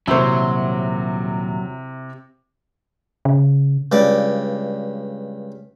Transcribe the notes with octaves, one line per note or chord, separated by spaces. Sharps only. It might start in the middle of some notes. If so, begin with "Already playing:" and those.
D#1 C3 F#3 E4 F#4 C5
C#3
C#2 G2 D5